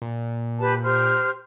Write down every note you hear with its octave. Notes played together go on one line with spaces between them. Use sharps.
A#2
G4 B4 A5
G4 C5 F6